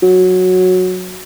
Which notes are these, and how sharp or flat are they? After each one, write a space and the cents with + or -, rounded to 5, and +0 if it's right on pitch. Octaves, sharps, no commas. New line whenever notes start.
F#3 -10